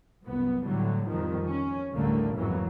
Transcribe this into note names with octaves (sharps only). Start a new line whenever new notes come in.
C2 F#2 B3
A2 D3 F#3 G3
F2 D#3 F3 G3
C#4
A1 D2 D3 G3 A3 A#3
F2 G#2 E3 F#3 A#3